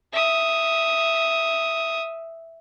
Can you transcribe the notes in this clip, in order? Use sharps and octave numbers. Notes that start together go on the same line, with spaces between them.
E5 D#6